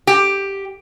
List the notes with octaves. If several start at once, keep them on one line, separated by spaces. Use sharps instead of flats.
G4